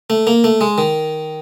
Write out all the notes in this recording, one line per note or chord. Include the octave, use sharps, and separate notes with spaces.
A3
A#3
A3
G#3
D#3